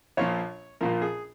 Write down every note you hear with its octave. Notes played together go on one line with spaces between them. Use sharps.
A#1 A#2 F3 C#5
A#1 A#2 F3 A#4
G#4